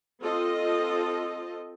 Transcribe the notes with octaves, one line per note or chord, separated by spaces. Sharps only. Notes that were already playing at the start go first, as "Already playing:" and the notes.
C4 F4 A4 D#5